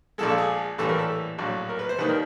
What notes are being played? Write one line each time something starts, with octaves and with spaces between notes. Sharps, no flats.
A#1 A#2 F3 G#3 A4
A4
G#4
A#1 A2 E3 G3 A4
A#4
A4
A#1 A2 F#3
A#4
B4
C5
D#2 D#3 G3 B4
A#4